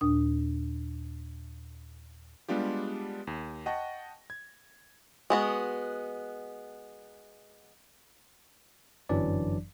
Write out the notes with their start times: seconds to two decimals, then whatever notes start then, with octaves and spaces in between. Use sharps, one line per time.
0.01 D#2 A#2 D4 D#6
2.48 G3 G#3 B3 D4 F4 G4
3.27 D#2
3.66 D#5 F#5 G5 A5 C#6 A#6
4.30 G#6
5.30 G#3 B3 F#4
9.09 G1 F#2 E3 F#3 D4 D5